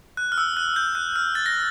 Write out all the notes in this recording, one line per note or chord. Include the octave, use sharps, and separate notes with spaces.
F#6
F6
E6
F#6
G6
F#6
F6
A6
A#6